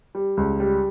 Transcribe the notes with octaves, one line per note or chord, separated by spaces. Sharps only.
G3
C#2
G3